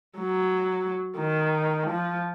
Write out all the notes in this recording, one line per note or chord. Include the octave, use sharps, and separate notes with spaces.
F#3
D#3
F3